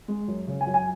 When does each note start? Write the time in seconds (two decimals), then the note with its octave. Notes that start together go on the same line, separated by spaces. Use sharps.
0.08 G#3
0.28 F#2
0.47 C#3
0.61 G#5
0.67 F#2
0.74 G#5